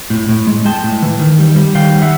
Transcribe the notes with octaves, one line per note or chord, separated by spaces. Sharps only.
A2
A2
G#3
G#3 G5 A5
A2
E3
D#3
G3
G3
D#3 F5 G5
G3
E5 F#5